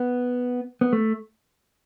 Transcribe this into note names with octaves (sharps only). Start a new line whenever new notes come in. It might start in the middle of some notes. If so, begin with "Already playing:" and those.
Already playing: B3
B3
A3